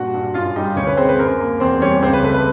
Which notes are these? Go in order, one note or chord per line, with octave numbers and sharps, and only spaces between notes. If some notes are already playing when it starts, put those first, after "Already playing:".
Already playing: G2 A#2 F#4 F#5
G2
F#2 F4 F5
G3 D#4 D#5
D2 C#4 C#5
B4
G#3 C4 C5
B4
F#2 A#4
A#3
E2 C4 C5
G3 C#4 C#5
C#2 C4 C5
B4
A3 B4
B4